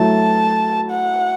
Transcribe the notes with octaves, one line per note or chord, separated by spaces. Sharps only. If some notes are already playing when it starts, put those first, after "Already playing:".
Already playing: F#3 A3 E4 A5
F#5